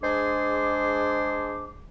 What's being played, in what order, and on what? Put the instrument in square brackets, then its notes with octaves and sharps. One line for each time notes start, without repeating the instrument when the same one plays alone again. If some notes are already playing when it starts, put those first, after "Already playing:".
[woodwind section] G#3 D4 G#4 C5 D6